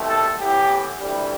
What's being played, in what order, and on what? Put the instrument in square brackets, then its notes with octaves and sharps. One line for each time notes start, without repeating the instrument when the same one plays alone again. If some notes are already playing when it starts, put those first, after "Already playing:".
Already playing: [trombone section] C2 B2 A3 C4
A4
A2 E3 B3 G4
D2 C3 E3 G3